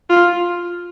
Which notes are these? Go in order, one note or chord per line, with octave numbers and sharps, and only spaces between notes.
F4